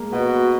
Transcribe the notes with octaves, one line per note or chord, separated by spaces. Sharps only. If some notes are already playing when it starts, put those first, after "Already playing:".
Already playing: G#3 A#3
B2 F#4